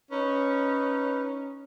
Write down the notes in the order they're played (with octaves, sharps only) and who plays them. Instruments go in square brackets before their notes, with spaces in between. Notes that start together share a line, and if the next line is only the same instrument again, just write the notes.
[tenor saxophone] C#4 [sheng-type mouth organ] D#4 B4